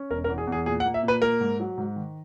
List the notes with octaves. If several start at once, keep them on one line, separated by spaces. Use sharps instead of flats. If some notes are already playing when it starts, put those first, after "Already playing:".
Already playing: C#4
E1 A#4
A#4
E2
G#4
E2
G#4
A#2 G#4
F#5
A#3
E5
A#2
B4
A#3 A#4
G#2
F#3
G#2
D#3